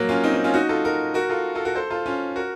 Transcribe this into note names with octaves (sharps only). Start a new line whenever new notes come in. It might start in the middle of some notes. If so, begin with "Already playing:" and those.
Already playing: F#3 A#3
C#4 F4
C4 D#4
C4 D#4
C#4 F4
D#4 F#4
F4 A4
F#4 A#4
F#4 A#4
F4 A4
F4 A4
F#4 A#4
A4 C5
F4 A4
C#4 F4
F#4 A#4